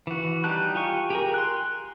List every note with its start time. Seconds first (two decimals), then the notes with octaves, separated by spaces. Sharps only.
0.07 E3 F#4
0.44 G3 D#4 G4 A5 F#6
0.75 F4 G4 G#5 C#6
1.10 G4 G#4 A#4
1.34 C6 F#6